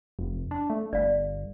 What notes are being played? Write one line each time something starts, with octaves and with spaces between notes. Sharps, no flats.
F1
D4
A3
G1 D5 F5